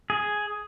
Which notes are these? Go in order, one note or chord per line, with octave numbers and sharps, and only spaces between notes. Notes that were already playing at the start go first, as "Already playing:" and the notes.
G#4